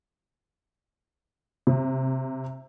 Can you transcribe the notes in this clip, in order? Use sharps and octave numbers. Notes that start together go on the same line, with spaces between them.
C3